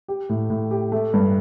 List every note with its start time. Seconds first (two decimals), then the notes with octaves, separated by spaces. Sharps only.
0.08 G4
0.29 A2
0.50 A2
0.71 G4
0.92 A3
1.14 G2